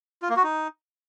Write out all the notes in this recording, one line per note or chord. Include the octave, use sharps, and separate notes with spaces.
F4
A#3
F#4
D#4